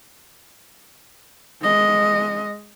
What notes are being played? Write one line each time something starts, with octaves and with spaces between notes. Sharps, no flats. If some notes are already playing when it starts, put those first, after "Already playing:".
G#3 D#5